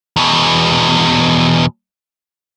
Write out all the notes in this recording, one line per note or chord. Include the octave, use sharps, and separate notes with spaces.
E2 B2